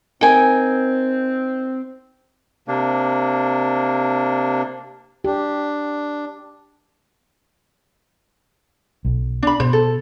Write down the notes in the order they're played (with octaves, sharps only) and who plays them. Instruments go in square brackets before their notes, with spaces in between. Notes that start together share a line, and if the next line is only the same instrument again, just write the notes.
[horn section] C4 [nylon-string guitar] D#4 A#4 [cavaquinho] G5 G#5
[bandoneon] C3 A#3 D4
[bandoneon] D4 [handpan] G4
[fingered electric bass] B1
[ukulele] D4 B5
[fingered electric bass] B2 [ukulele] C5
[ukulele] A4